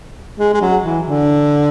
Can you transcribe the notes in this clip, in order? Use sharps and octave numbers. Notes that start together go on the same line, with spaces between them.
G#3
G#3
F#3
E3
D3